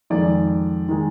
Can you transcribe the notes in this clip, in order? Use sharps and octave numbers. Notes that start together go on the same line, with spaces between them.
F2 D#3 G#3 D5
D#3 G#3